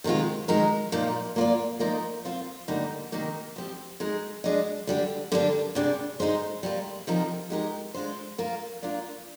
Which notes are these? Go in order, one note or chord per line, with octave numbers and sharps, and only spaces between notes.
C3 D#3 G#3 C4 F4
D#3 G#3 D#4 A#4
A#2 F3 A#3 D#4
A#3 F4 A#4 D5
F3 A#3 D#4 A#4 D#5
C4 F4 C5 F5
D3 G3 A#3 D#4 G4
C3 D#3 A#3 D#4
F3 C4 G4
G#3 D#4 G#4 D#5
G#3 D4 G#4 D#5
D3 G3 D4
D3 G3 A#3 D4
C3 G3 D4 G#4 D5
G#3 D#4 G#4 C5
G3 A#3 F4
C3 F3 C4 D#4 A#4
G#3 D#4 G4 A#4
G#3 D4 F4 C5
A#3 F4 A#4 F5
A#3 D4 F4